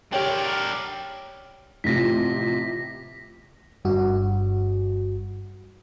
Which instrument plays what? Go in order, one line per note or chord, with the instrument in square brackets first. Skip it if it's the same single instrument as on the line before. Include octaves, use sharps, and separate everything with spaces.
[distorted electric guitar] D4 A#4 [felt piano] G4 C#5 G5
[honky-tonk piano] A1 C3 F3 [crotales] A#6 B6
[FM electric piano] G1 G2 F#4